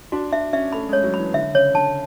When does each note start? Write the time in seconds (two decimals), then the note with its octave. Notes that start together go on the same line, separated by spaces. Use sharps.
0.12 D4 F#4
0.32 D4 E5
0.53 C#4 E5
0.73 A3 B5
0.89 G#3 C#5
1.03 F#3
1.14 E3 B5
1.34 D3 E5
1.54 C#3 C#5
1.74 D3 A5